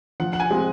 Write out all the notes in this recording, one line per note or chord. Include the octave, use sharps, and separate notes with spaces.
F3 F#5
F#5
G#5
G#3 C4